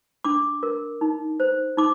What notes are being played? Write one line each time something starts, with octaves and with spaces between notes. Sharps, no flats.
D4 D6
A#4
D#4
C5
D#4 D6